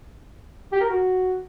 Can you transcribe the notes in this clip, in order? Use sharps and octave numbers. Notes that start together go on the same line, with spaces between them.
G4
A#4
F#4